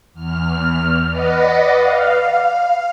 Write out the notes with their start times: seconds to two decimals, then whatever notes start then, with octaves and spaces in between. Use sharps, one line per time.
0.13 E2 F6
1.09 B4 D5 D#5 F#5
1.74 F5